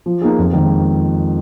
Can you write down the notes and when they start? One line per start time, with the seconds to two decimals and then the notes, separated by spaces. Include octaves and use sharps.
0.06 F3
0.22 A#3 D#4 G#4
0.38 F2
0.53 D#3 G#3